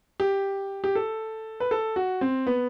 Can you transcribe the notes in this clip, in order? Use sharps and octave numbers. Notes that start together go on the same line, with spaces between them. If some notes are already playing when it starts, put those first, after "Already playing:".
G4
G4
A4
B4
A4
F#4
C4
B3